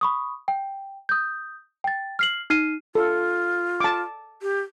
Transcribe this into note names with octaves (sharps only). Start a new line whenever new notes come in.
B5 C#6 D#6
G5
D#6 G6
G5 A6
F6 C7 F#7
D#4 F6 C7 D#7
F4 A4
A5 D6
G4